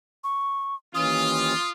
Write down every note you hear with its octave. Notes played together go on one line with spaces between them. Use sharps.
C#6
D#2 E3 C#4 F4 D#6